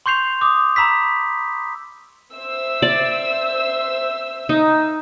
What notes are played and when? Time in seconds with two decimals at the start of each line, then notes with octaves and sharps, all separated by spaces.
0.06 C6 C#6 G6 C7 F7
0.41 D6 D#6
0.76 A#5 B5 E6 B6
2.33 C5 E5 E6
2.82 D5
4.49 D#4